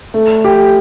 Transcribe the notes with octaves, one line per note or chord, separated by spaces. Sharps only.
A3
G4